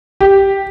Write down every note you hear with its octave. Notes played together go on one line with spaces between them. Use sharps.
G4